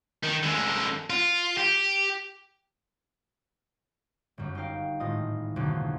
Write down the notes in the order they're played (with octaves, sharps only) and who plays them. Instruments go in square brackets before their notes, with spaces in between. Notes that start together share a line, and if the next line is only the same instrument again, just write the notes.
[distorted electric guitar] D#3
D3 G#3
F4
G4
[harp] G1 F#2
D#4 A#4 F5 G5
G#1 A2 F4 D#5 D#6
B1 F2 B2 D3 D#3